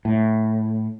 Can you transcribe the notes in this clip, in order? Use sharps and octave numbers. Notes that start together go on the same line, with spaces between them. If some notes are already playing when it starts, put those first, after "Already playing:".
A2